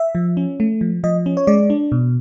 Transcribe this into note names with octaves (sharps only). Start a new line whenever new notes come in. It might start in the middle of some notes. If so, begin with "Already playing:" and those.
Already playing: E5
F3
C#4
A3
F3
F3 D#5
C#4
C#5
G#3 D5
D4
B2